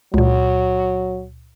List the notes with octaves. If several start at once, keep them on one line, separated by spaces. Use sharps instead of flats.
C#2 A#2 F#3